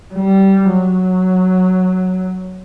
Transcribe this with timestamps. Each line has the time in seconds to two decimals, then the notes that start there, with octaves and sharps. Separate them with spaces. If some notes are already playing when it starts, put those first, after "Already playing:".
0.14 G3
0.73 F#3